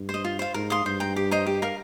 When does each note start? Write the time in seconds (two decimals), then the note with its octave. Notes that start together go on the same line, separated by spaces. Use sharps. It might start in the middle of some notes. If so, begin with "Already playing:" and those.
Already playing: G2
0.09 C5
0.14 D#5
0.25 F4
0.39 C5 F5
0.54 G#2 A#4
0.70 F5 C6 D#6
0.85 G2 C5
1.00 G5 A#5
1.16 G4
1.31 C5 D#5 A#5
1.46 G4
1.62 A#4 F5